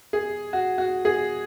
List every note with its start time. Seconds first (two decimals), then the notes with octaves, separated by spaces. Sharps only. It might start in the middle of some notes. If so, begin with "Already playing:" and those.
0.13 G#4
0.53 F#4
0.78 F#4
1.05 G#4